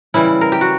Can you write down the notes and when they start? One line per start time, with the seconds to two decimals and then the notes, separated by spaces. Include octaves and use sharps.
0.14 C#3 E3 G3 E4
0.41 A#4
0.52 G4
0.61 F#4